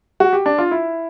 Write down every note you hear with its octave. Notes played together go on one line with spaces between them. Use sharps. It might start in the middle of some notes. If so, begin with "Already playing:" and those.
F#4
G4
D4
F4
E4